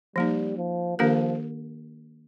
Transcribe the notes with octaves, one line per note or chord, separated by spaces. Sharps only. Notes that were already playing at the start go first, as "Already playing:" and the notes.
F3 G3 A#3 D#4
F3
D#3 F3 A#3 D4 G4 A#4